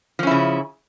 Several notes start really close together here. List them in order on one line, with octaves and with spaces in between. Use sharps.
F3 C#4 E4 C#3